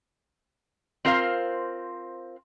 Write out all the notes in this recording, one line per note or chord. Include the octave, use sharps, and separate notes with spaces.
C4 F4 A#4 C5 F5